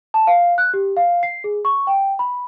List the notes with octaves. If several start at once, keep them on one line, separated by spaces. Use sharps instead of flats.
A5
F5
F#6
G4
F5
C7
G#4
C#6
G5
B5